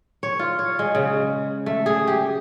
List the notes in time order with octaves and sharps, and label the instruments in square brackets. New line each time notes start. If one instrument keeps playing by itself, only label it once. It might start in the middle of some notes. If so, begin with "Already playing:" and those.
[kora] C#5
F4
C#5
G#3
C#3
A3
G#4
G4